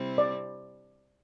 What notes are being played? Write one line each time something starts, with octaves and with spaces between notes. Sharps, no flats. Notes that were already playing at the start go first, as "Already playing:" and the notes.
Already playing: C3 G3 C4 E4
D5